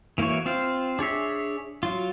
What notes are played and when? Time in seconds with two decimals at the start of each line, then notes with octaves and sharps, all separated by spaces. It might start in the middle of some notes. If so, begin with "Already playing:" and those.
0.18 E3 A#3 E4 F#4 C#5
0.46 C4 F4 C5 F5
0.99 D4 G#4 C#5 E5
1.83 F#3 F4